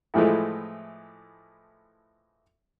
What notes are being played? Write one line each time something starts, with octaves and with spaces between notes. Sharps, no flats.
A2 E3 F3 G#3 A3